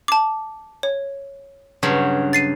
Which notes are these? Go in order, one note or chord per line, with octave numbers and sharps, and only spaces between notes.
A5 D6
C#5
G2 C#3 F#3
A6 C7 D#7